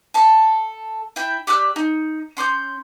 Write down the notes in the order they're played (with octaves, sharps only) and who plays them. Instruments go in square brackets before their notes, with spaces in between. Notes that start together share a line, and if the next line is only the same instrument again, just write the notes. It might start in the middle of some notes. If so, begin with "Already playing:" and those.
[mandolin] A4 A5
E4 G5
G4 D5 E6 F#6
D#4
C#4 C6 D6 G6